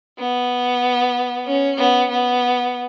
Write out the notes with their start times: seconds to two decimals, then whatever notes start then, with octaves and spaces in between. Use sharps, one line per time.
0.19 B3
1.47 C#4
1.78 B3
2.11 B3